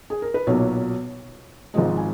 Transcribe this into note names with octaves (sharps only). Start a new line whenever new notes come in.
G#4
A#4
B4
B1 A#2 F#3 A#3 C#5
G#1 G#2 F3 G#3 D#5
G#5